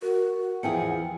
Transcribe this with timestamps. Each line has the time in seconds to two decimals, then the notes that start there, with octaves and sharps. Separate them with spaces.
0.02 F#4 A#4
0.41 F#5
0.63 E2 F3 E4 G#4 G5 G#5 C#7